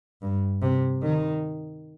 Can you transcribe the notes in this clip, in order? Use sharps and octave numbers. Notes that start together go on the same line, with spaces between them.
G2
C3
D#3